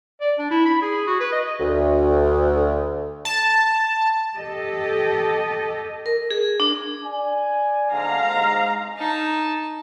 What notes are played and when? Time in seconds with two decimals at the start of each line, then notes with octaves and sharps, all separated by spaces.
0.20 D5
0.38 D4
0.51 E4
0.65 B5
0.82 G#4
1.07 F#4
1.20 B4
1.32 D#5
1.59 D2
3.25 A5
4.37 G4 A4 D#5
6.06 A#4
6.31 G#4
6.60 D4
7.04 D5 G#5
7.92 G#2 D3 F5 A#5
8.26 G#2 G#3
8.97 D#4 A5